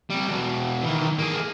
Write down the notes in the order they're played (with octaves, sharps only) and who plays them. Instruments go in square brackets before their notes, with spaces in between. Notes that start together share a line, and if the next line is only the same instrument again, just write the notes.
[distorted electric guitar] C3 G3
E2 B2
D#3 E3
A#3 G#4